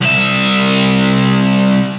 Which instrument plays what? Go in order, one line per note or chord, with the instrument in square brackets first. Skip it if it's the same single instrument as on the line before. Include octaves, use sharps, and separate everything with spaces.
[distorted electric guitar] C2 E5